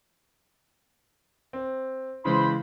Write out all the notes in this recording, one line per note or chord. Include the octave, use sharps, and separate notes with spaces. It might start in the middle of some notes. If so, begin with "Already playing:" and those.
C4
C#3 E3 G#3 C5 B5 C6